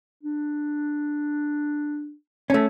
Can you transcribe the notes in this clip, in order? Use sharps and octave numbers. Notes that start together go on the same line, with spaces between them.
D4
A3 C#4